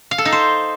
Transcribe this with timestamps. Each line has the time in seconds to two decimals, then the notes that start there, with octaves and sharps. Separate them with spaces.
0.11 F5
0.18 A4
0.25 D#4
0.32 C5